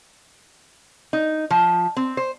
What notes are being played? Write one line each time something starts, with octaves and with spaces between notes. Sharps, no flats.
D#4
F3
C4
C5